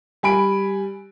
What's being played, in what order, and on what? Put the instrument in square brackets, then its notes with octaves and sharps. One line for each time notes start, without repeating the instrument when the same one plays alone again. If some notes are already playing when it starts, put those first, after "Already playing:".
[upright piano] G3 G#5 B5 D7